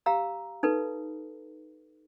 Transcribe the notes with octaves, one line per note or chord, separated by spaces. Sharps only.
G4 F5 A#5 E6
D#4 A4 B4